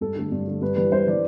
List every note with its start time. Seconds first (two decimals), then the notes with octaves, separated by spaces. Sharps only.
0.01 G2 A4
0.16 D3 A3
0.32 G2
0.47 D3 A3
0.61 G2 B4
0.76 E3 G3 B4
0.92 G2 C5
1.07 E3 G3 D5